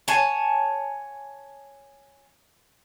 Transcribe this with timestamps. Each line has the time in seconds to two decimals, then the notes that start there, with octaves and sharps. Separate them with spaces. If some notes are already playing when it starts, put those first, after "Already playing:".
0.08 C#5 F#5 G#5 A5